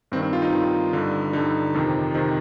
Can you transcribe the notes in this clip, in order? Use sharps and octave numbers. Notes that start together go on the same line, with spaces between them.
G2 D#3 C4
C4
F4
D#4
G2 D#3
G2 D3
G2 D3 D#4
F2 C3 D#3
C3 D#3